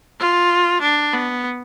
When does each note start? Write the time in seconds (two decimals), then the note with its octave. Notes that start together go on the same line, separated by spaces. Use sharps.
0.19 F4
0.81 D4
1.13 B3